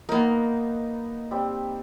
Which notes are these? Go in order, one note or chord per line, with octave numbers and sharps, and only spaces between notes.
A#3 B3 D#4 A#4
G3 C4